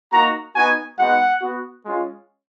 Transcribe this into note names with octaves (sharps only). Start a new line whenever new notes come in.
A#3 D#4 F#4 A#5
B3 D#4 F#4 G#5
G#3 B3 D#4 F#4 F#5
B3 F#4
G#3 C#4 F4